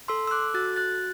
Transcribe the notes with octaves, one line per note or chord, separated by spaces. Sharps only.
A4 C6 E6
E6
D6 F#6
F#4 F#6 A6
F#6 A6